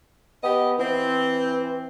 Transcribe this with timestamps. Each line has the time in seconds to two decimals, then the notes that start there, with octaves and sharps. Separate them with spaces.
0.43 B3 G4 D#5
0.78 E3 C4